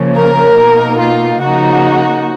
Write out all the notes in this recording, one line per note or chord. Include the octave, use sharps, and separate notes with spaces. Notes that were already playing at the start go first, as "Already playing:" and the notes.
Already playing: C#3 F3 A#3 C#4
A#4
B2 A#3 D#4
F4
C#3 F3 A#3 D#4 F#4